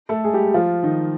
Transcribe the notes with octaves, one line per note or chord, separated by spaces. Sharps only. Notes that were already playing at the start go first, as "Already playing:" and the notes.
A3 A4
G#3 G#4
G3 G4
F3 F4
D#3 D#4